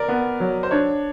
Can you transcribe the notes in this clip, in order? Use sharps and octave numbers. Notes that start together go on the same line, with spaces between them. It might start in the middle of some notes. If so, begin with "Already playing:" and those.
Already playing: A#4 D5
B3
F#3
C5
D4 C#5